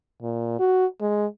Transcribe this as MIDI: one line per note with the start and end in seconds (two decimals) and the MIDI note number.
0.22 0.56 46
0.59 0.86 66
1.01 1.26 56